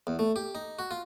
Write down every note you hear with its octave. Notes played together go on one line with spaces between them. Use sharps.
E2
A3
G4
D#4
F#4
F4